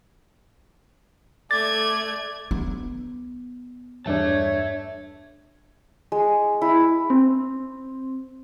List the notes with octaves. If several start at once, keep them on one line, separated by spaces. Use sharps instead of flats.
A3 D5 G#6 A6
B3
E2 G2 D4 C#5 E5 A5
G#3
E4
C4